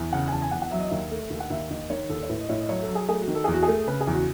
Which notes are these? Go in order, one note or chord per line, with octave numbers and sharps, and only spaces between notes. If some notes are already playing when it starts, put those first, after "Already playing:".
Already playing: E2
C#3 F#5
G#5
E2 A5
G#5
E2 F#5
F#5
F#3 E5
D#5
D#2 E5
A3
D#2
F#5
D#2 E5
D#2 D#5
D#3 C#5
D#2 A4
C#5
A2 B4
D#5
A2 C#5
D#5
F#3 C#5
A4
F#3
G#4
A3 G#4
F#4
D#3
A4
E2 G#4
F#4
G#4
A3
C#3 B4
G#4
E2
F#4